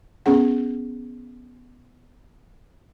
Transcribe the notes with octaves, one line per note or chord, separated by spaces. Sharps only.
B3 C#4 G#4 F#5